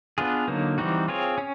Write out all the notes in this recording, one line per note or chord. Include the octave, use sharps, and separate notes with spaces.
B3 D4 F4 G#4
D3 F#3 A#3 D#4
E3 G3 C4 D#4 F#4
C4 F4 G#4 C#5
C#4